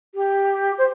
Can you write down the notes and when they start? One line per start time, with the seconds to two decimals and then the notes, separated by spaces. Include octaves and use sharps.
0.15 G4
0.78 C5